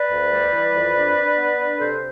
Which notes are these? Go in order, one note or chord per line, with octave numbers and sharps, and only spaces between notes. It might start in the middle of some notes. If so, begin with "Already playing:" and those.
Already playing: B4 D5
D2
G3
E3
F2
D4
D4
B3
D4
C3 A4 C5